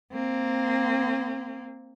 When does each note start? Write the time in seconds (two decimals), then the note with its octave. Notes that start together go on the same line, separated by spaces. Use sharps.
0.12 A#3 C4